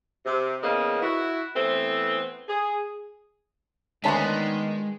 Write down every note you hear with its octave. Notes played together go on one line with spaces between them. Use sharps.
C3
E2 C#3 A#3 B3 D#5
E4 F#4
E3 A3 B3 C4
G#4
D2 D#3 G#3 B3 C#4 D4 A5 B5